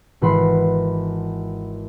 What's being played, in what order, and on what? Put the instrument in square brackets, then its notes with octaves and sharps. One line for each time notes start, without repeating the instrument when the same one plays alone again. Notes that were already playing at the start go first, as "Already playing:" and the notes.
[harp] G#1 E3 B4 F#5 B5 C6